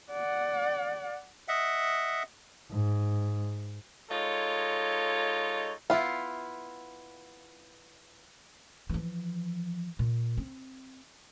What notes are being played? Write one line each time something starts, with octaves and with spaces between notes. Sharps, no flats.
D5 F#5
D#5 E5 F#5
G#2
G#3 D#4 F4 A4 C#5
B3 E4 F4 E5 F5
E3 F3
A#2
C4